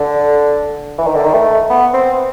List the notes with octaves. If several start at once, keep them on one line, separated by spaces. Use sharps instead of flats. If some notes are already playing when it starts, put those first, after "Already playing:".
Already playing: D3
E3
D#3
D3
D#3
A3
B3
C4